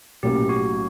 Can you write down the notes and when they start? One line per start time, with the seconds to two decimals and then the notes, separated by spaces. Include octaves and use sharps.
0.23 B1 A2 F#3 A#3 C#4 G4
0.49 F#4